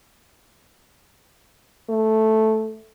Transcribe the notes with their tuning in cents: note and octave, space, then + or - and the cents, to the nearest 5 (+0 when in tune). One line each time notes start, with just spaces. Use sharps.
A3 -5